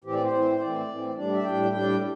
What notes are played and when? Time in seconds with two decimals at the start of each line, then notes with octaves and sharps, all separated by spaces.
0.04 A2 E3 C4 G4
0.14 D5
0.23 C5
0.32 A2 E3 C4
0.60 A2 E3 C4 D5
0.88 A2 E3 C4
1.16 A2 G3 D4 D5
1.33 E5
1.44 A2 G3 D4 G5
1.73 A2 G3 D4 G5